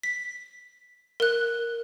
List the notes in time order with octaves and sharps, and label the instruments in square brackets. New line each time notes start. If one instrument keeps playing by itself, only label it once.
[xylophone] B6
A#4 F#6